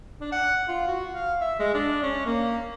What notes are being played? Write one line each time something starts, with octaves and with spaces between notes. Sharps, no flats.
D4
F#5
F4
F#4
F5
E5
G#3
D4
C#4
A#3